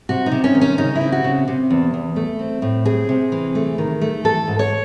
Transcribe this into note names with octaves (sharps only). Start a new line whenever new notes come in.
C3 F#4
D#4
C3
C#4
D#3
C#4
C#3 D#4
E4
C4
F#4
C#3
C3
E2
E2
A3
C4
A2
C4 G#4
C3
E3
A3
D#3
A3
E3 A4
G#2
C#5